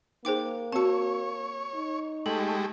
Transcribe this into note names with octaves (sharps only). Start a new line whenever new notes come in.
A#3 D#4 G#4 C5 G5 D6
C4 F#4 C#5 A5 C#7
D#4
G#3 A3 G4 A4